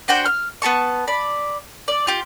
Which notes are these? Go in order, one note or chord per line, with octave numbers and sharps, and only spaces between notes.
D4 F#4 C5 G5
F6
B3 G4 A5 C#6
D5 B5
D5
F4 G4